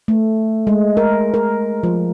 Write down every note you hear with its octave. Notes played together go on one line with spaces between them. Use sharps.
A3
G#3
A#4
A#4
F3